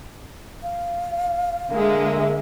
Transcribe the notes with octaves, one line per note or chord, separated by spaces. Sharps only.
F5
D3 G#3 A#3 E5